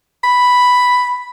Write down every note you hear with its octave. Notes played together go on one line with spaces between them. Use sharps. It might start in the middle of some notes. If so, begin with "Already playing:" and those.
B5